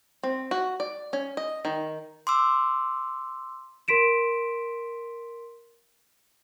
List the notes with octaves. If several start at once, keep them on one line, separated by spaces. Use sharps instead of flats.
C4
F#4
D5
C#4
D#5
D#3
C6 D6 E6
A#4 C6 B6 D7 E7